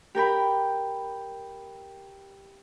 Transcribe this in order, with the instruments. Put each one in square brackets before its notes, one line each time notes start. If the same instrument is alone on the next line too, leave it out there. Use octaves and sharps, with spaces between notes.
[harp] G4 A#4 G5 B5